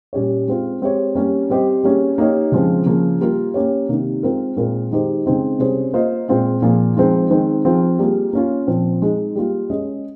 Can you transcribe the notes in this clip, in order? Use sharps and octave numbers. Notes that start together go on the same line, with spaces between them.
A#2 G3 C#4 G4 C#5
G#3 C4 F4
G#3 C4 G4 C#5
G3 A#3 C#4
G3 C4 G4 C5 D#5
G3 A#3 C#4 G#4
A#3 D#4 G4 C#5
C#3 F3 G#3 C4 F4
C#3 F3 A#3
G3 A#3 F4 A#4
A#3 C#4 G4 C#5
C3 D#3 A#3
G#3 C4 F4 A#4
A#2 G#3 C4 F4 A#4
D#3 G#3 D#4 G4 C5
C#3 G#3 C4 D#4
C3 G3 C#4 G#4 C5
A#3 F4 C5 D#5
A#2 G#3 C4 F4 G#4
A#2 F3 A#3 F4 G#4
F3 G#3 C4 D#4
D#3 G#3 C4
F3 C4 F4 G#4
G3 A#3 F4 G#4
A#3 C#4 F4
A#2 F3 C4
G#3 D#4 G#4
G3 A#3 F4
G#3 C#4 G#4 D#5